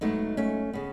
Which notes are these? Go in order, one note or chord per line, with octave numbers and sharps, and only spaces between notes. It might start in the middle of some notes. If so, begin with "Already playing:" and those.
G#2 F#3 A3 B3 D#4
A3 C#4
C#3 B3